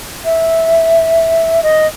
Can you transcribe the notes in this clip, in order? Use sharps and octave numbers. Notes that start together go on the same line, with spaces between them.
E5
D#5